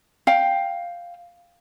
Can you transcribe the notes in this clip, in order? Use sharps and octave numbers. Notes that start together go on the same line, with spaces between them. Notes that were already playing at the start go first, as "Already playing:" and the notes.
F5 G5